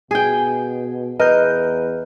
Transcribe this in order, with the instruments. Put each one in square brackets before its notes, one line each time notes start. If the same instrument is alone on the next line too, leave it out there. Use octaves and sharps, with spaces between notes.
[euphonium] B2 [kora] G#4 G5
[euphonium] E2 [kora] A#4 [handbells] B4 [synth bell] D#5 G6